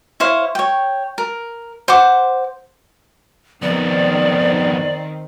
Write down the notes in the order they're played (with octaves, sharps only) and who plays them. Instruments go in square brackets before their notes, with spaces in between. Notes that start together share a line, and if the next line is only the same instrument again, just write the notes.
[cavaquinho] E4 C5 C#5 F5
C#5 G5
A#4
C5 F#5 D6
[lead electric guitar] F2 B3 [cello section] D#3 C4 [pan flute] D5